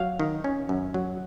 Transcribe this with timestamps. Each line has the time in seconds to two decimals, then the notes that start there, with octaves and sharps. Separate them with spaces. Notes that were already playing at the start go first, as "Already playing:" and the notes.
Already playing: F#3 F5
0.20 D#3
0.44 C#4
0.69 F#2
0.94 F#3